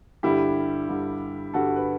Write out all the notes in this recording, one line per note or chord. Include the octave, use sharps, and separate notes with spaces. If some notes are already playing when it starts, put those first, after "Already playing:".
G2 D3 G3 E4 G4
G2 D3 G3
G2 D3 G3 F#4 A4
B4